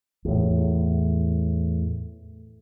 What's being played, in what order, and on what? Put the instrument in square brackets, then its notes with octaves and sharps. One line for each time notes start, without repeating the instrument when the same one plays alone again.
[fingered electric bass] E2 A2